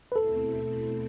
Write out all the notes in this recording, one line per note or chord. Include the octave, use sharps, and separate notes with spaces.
B4
B2 A3 C4 E4 A4